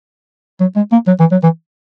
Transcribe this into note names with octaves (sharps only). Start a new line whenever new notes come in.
F#3
G#3
A#3
F#3
E3
F#3
E3